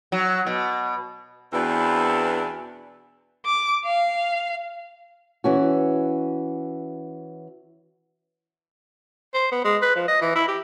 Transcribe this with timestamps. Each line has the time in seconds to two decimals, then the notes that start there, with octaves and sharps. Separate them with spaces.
0.12 F#3
0.46 B2
1.53 E2 B2 C4 D4 B4
3.46 D6
3.85 F5
5.44 E3 C#4 F#4
9.34 C5
9.51 B3
9.64 G#3
9.82 B4
9.96 F3
10.08 D#5
10.21 E3
10.35 E4
10.48 G4